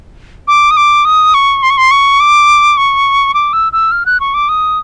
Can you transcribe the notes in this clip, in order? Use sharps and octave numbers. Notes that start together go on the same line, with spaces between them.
D6
D#6
D6
D#6
C#6
C6
C#6
C6
C#6
D6
C#6
D6
E6
E6
F6
F#6
C#6
D6
D#6